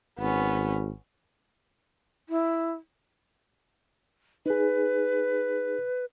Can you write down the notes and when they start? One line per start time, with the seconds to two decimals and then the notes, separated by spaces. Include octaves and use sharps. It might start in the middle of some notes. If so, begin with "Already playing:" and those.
0.19 G#1 B3 C#4
2.29 E4
4.46 D#4 G#4 B4